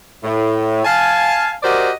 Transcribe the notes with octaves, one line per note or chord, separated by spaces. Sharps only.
A2
F5 G#5 A5
F#4 G4 A#4 C5 D5 D#5